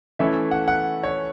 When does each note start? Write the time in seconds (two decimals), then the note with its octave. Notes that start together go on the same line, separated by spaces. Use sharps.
0.19 E3 A3 C#4 E4 E5
0.51 F#5
0.68 F#5
1.03 C#5